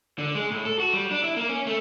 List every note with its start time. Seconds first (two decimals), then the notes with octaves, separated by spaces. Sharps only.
0.18 D3
0.35 G#3
0.51 A2
0.65 A4
0.79 F#4
0.93 G3
1.11 D4
1.24 E4
1.36 A#3
1.49 C#4
1.67 A3